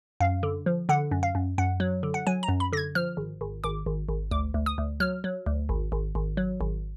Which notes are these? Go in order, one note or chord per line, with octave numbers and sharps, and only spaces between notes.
F#2 F5
D3
F3
D3 F#5
F#2
F5
F#2
F#2 F#5
F#3
D3
F#5
F#3 G#5
A#5
F#2
B5
D3 G#6 A#6
F3 F6
G#1
G#1
G#1 D6
G#1
G#1
D2 D6
D2
D#6
D2
F#3 F6
F#3
D2
G#1
G#1
G#1
F#3
G#1